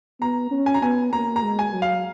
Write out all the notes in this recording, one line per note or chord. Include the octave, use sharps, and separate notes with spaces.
B3 A#5
C#4
G#5
A#5
B3 G#5
A#3 A#5
A#5
G#3
G#5
F#3
F5